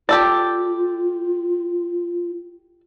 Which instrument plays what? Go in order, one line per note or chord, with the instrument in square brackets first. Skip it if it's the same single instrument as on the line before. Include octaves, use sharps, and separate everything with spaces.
[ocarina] F4 [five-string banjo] G4 A4 D5